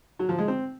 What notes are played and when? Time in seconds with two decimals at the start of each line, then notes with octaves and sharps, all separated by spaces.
0.19 F#3
0.29 F3
0.38 G#3
0.48 C4